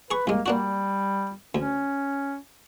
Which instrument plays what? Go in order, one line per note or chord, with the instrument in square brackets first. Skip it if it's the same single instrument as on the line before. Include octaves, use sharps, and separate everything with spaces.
[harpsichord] G#4 C#6 [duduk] B4
[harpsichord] C2 G#3 [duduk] A#3
[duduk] G3 [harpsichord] A#3 D4 F#4
[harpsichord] D2 [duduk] C#4